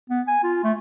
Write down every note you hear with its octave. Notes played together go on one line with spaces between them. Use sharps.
B3
G#5
F4
A3